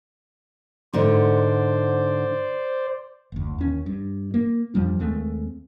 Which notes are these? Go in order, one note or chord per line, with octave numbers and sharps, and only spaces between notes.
G#2 D3 C5 D5
F#1 D2
D#2 C#4
G2
A#3
F2 F3 G3 D4
D#2 G#3 A3 C4